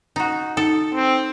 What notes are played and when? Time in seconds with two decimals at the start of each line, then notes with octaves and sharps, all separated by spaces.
0.16 D#4 F#4
0.57 D#4 A4
0.94 C4